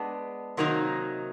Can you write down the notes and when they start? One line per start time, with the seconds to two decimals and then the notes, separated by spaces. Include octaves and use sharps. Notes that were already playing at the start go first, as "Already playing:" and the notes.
Already playing: G#3 B3 D4
0.57 C3 D#3 F#3 A#3 D#4